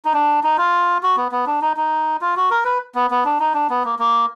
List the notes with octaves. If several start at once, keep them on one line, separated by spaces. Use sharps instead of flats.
D#4
D4
D#4
F4
F#4
B3
B3
D4
D#4
D#4
F4
F#4
A#4
B4
B3
B3
D4
D#4
D4
B3
A#3
A#3